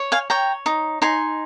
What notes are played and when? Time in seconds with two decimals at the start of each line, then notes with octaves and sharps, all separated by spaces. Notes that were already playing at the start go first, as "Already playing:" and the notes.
Already playing: C#5
0.12 F5 G#5
0.30 C#5 G5 A#5
0.66 D#4
1.02 D#4 G#5 C6